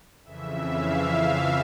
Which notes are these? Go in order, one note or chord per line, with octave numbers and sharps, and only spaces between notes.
F2 C#3 E3 E5
F5